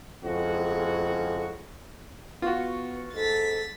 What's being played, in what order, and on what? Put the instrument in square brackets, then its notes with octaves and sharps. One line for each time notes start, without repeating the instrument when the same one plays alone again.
[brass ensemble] F2 A2 C#3 G#3 F#4
[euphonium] B3 [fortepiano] F4 F#4 [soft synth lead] C#6
[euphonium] G#2 [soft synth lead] A4 [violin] A6 B6